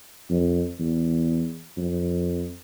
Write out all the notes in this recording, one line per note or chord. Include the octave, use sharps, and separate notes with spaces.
F2
E2
F2